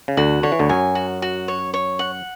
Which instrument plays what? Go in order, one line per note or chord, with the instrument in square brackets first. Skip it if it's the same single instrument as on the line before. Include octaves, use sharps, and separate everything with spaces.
[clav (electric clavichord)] C#3
[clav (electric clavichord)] D2 D3 [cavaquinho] F#4
[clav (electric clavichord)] D3 [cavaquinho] C#5
[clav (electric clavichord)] E3
D2 D3
[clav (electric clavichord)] F#2 F#3 [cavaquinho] G#5
[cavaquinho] F#4
F#4
C#5
C#5
F#5